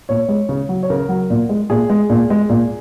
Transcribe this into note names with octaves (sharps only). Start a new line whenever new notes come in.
A#2 C#5
G#3
C#3
F#3
C#5
C#3 A#4
F#3
A#2
G#3
A#2 G#4
G#3
A#2
G#3
A#2